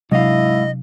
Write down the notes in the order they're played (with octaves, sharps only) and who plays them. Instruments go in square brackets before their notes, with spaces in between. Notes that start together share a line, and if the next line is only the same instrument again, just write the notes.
[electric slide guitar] G#2 F5 [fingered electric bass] C3 F#3 D4 [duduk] E4 [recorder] D#5